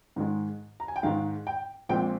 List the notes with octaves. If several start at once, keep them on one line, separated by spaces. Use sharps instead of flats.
G#2 D#3 G#3
A#5
G#5
G5
G#2 D#3 G#3 F5
G5
A#1 A#2 G#3 C4 G5